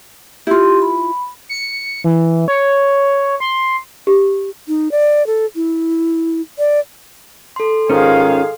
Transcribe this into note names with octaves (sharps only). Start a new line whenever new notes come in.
E4 F4 G4 C6
B5
C#7
E3
C#5
C6
G4
D#4
D5
A4
E4
D5
A4 C6
G#2 D#3 C#4 F4 G#4 F5